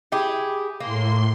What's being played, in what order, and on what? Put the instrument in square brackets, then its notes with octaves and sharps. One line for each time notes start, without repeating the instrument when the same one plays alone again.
[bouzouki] E4 G4 G#4
[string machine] A2 C6 [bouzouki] A#3